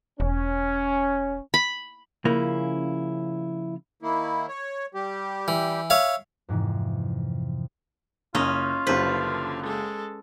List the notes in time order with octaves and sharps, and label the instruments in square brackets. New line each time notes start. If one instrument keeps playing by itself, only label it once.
[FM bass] E1 [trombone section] C#4
[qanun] B5
[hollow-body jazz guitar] C#3 F3 A#3 C#4 E4
[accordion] D#3 A#3 E4
C#5
G3 G4
[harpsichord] E3
C#5 E5 F5
[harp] F2 G#2 C3 E3
[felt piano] F#1 [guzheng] C#4 D#5 [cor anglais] F4
[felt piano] F#1 G4 C5 [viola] D3 F3 [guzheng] B4
[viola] G#3 A4